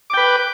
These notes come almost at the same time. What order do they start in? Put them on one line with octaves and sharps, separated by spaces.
D6 G5 B4